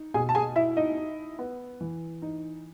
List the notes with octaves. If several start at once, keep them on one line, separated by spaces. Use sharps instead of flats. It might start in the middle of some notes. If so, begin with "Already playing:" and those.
Already playing: D#4
B2 G#4 G#5
A5
G#4 G#5
E4 E5
D#4 D#5
D#4
B3
E3
D#4